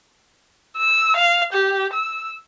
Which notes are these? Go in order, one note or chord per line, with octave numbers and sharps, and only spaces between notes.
E6
F5
G4
E6